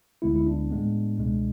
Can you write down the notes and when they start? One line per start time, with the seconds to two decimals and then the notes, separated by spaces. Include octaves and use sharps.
0.22 D2 D3 G#3 B3 E4
0.36 E4
0.47 D4
0.70 A2 G#3 B3
1.18 C#2 B2 G#3